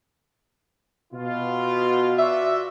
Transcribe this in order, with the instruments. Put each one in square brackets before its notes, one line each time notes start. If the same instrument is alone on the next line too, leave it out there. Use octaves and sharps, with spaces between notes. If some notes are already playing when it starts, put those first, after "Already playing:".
[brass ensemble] B2 F4
[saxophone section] F#4 D5 E5